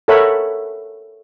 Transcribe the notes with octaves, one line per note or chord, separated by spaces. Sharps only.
A4 A#4 C#5 E5 F#5 B5